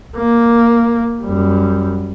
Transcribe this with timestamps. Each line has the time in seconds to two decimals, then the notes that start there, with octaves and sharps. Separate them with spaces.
0.17 A#3
1.23 F#2 G3